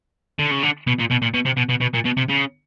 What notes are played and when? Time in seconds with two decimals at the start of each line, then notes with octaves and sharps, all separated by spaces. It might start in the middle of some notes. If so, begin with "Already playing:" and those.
0.39 D3
0.51 C#3
0.63 D3
0.87 B2
0.99 A#2
1.11 B2
1.22 A#2
1.34 B2
1.46 C3
1.57 B2
1.70 B2
1.81 B2
1.94 A#2
2.05 B2
2.17 C3
2.29 C#3